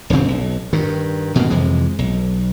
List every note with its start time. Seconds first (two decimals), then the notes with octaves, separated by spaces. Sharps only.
0.10 E1 D2 C#3 C4
0.28 B1
0.73 G2 D#3
1.36 B2 E3 A#3
1.50 F2 C3 E3 G#3
1.99 B1